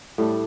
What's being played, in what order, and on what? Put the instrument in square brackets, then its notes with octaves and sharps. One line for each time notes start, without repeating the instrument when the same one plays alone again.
[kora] A2 G3 D4